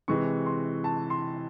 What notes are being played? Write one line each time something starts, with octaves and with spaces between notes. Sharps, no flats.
C3 E3 G#3 C#6
C6
A5
C6